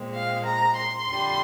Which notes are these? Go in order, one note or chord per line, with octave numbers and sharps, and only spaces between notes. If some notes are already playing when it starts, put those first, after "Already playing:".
Already playing: A#2 G#3 C4
F5
A#5
C6
F2 D3 G3